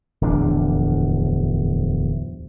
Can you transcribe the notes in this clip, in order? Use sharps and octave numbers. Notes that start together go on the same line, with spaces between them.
D1 E2 F3 D4